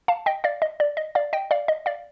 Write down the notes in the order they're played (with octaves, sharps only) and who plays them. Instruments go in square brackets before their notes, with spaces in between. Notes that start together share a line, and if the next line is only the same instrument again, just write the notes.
[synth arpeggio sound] F5 A5
D#5 G5
D5 F5
D#5
D5
D#5
D5 F5
D#5 G5
D5 F5
D#5
D5 F5